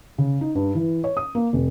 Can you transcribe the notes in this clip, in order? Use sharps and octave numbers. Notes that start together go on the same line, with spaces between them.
C#3
D#4
G2
E3
C#5
D#6
A#3
F1